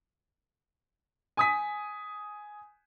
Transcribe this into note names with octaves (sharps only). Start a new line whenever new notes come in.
G#5 D#6 B6